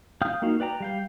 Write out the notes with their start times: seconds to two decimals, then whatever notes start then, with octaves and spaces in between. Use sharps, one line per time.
0.22 F5 G5 D#6 F6 G6
0.42 A#3 D#4 F#4 F5
0.60 B4 D5 G5 A#5
0.80 G3 F5 G5